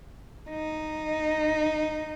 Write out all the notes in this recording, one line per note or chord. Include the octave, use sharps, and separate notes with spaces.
D#4